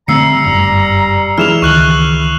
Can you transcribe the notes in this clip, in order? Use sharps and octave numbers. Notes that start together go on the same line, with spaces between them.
D3 G3 A3 C4 A#5 E6 C7 C#7
F#1 G2
E3 G#3 E4 F6 E7 F7
C#2 D#3 C#6 F#6 F#7